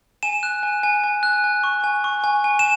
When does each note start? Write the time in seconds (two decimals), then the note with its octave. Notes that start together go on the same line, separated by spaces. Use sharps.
0.23 G#5 E7
0.43 F#6
0.63 G#5
0.83 G#5
1.04 G#5
1.23 F#6
1.44 G#5
1.64 C#6
1.84 G#5
2.04 C#6
2.24 G#5
2.44 G#5
2.59 E7